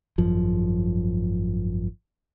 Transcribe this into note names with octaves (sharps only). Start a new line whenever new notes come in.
G#1 F#2 F3